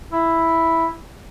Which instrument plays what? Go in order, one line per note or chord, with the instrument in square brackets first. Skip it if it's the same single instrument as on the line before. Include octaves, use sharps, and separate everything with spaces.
[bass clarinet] E4